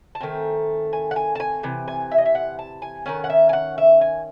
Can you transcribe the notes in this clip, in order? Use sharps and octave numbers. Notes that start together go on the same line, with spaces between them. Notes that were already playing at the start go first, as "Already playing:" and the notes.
A5
D#3 A3 C4 G#5
G#5
F#5
G#5
A5
G#5
C3 E3
G#5
E5
D#5
E5
F#5
A5
G#5
D#3 F#3 C#4 F#5
F#5
E5
G#5
F#5
E5
G#5